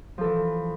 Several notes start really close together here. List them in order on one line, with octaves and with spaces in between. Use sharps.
F3 A4 E3